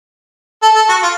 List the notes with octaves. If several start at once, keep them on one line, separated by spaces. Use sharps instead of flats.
A4
A4
F#4
F4